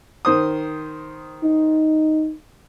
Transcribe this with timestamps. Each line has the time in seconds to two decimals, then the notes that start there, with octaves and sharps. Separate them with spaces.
0.25 D#3 C5 D#6
1.43 D#4